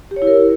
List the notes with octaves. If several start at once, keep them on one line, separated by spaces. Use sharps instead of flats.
G4
C#5
E4
A#4